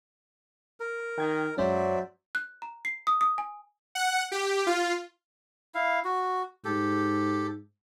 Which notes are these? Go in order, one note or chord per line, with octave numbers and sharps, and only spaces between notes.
A#4
D#3 G5 G#6
F#2 F#3 G#3 C#4 C5 D5 E5
F#6
A#5
C7
D#6
D#6
G#5
F#5
G4
F4
E4 F5
F#4
G#2 G4 A4